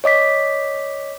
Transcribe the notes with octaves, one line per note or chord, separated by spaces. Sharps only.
C#5 D#5 D6 B6